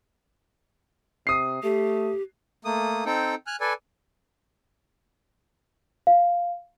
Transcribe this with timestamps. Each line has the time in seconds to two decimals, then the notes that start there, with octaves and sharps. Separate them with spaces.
1.27 C3 D#6 C7
1.63 A3 G4
2.65 A3 A#3 D#6
3.06 C4 D#4 A4 G5
3.47 G#5 F6 F#6
3.61 A4 B4 D5 G#5
6.07 F5